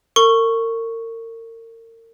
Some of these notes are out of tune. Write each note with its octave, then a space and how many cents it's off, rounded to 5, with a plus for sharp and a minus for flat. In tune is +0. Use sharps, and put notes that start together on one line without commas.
A#4 -35 C#6 +0